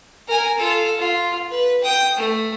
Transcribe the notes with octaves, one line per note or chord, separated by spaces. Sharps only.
A#4 G#5
F4 A4
F4
B4
G5 D#6
A3